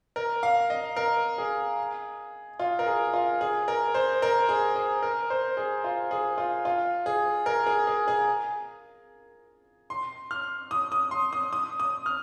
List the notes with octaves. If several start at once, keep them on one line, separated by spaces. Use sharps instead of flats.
A#4
F5
D#5
A#4
G#4
F4
A#4
G#4
F4
G#4
A#4
C5
A#4
G#4
G#4
A#4
C5
G#4
F4
G#4
F4
F4
G#4
A#4
G#4
G#4
G#4
C6
F6
D#6
D#6
C6
D#6
D#6
D#6
F6